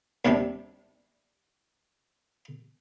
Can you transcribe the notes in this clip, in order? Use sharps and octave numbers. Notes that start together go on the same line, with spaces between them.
D#2 C3 G3 D4